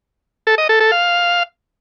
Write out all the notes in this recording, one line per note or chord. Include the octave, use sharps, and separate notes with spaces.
A4
D#5
A4
A4
F5